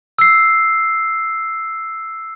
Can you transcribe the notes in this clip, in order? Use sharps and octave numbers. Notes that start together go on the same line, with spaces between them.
E6 C7